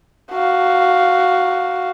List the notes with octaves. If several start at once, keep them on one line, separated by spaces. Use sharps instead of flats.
F#4 F5